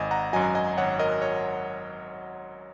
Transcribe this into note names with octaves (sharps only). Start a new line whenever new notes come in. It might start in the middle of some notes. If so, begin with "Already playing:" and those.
Already playing: G#1 D#5 G#5
F#5 A#5
F#2 F#3 D#5 G#5
D#5 G#5
G#1 C#5 F#5
A#4 D#5
C#5